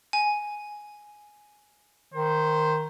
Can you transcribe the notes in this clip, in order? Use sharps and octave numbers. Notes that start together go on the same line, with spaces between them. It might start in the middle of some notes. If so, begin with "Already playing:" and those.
G#5
D#3 C5